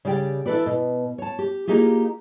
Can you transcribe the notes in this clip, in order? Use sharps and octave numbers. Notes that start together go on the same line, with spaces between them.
C#3 G3 G4 D5 G5
E3 D4 A4 B4 D5
B2
C#5 A5
G4
A#3 D#4 F4 G4 G#4